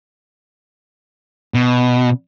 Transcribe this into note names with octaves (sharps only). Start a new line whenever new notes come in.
B2